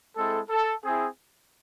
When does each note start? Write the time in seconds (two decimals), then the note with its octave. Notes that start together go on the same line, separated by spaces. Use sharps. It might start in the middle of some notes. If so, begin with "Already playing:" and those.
0.16 G#3 C4 E4 A4
0.49 A4
0.83 C4 E4 G#4